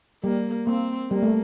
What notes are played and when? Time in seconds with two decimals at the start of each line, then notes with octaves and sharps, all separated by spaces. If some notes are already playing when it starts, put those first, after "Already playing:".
0.24 G3 A#3
0.67 A#3 C4
1.10 G3 A#3
1.23 A3